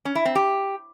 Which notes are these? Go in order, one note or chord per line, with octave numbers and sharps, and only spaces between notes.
C#4
E4
C4
G4